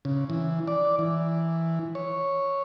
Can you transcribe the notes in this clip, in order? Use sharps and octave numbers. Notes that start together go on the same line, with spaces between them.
C#3
E3
D5
E3
C#5